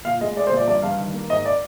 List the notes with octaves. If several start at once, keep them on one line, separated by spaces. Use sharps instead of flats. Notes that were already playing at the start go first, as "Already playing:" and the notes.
A#2 F5
G#3 D#5
G#3 D5
C5
A#2
D5
G2 D5
G2 F5
D#3
A#3
G#2 D#5
D5